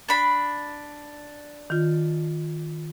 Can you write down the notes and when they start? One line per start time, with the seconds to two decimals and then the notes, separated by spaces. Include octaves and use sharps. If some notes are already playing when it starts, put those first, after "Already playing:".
0.09 D4 B5
1.70 D#3 F4